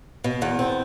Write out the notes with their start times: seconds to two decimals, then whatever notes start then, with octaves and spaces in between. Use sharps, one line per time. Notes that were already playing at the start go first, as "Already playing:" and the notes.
0.24 B2
0.42 E2
0.59 C4